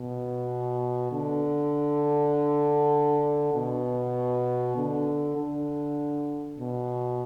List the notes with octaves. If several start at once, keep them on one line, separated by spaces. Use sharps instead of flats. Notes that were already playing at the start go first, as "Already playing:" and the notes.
Already playing: B2
D3
B2
D3
D3
B2